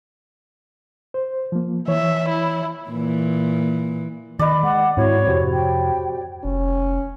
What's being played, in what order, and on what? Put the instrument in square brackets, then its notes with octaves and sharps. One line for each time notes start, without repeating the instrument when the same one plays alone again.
[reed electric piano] C5
F3 A#3
[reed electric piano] E3 C#5 [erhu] E5
[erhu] E4
[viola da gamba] A#2 E3
[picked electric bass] D#3 [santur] B4 D5 [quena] D#5
[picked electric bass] G#3 [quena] F#5
[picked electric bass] G#2 G#3 [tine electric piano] C4 E4 F#4 [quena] C#5
[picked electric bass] F2 C3 [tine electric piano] F#4 G4 C5
[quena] G5
[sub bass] F1 [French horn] C#4